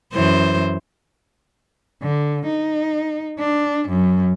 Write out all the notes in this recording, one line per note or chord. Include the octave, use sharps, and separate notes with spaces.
F#2 E3 C5
D3
D#4
D4
F#2